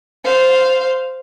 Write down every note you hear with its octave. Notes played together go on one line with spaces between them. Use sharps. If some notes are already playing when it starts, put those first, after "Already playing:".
C5 F5